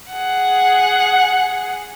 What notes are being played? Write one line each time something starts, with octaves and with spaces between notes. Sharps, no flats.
G#4 F#5